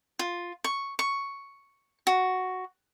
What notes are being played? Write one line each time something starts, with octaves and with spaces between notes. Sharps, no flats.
F4
C#6
C#6
F#4